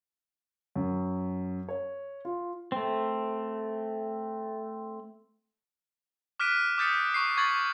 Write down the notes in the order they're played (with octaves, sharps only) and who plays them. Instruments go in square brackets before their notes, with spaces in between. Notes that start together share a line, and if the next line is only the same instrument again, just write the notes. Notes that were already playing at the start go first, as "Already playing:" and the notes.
[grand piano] F#2
C#5
F4
[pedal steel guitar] A3 C4
[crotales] D6 F6 F#6 B6 D7 D#7
D6 D#6 G6 A6 B6 C#7
C#6 C7
C#6 G#6 A6 B6 C#7 F#7